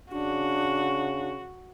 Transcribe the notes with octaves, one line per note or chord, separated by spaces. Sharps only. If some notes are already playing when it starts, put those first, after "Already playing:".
C#3 D4 F#4